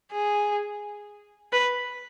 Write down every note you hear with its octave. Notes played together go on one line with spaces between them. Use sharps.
G#4
B4